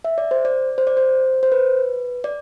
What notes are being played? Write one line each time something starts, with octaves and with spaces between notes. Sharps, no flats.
E5
D5
C5
D5
C5
D5
C5
C5
B4
D5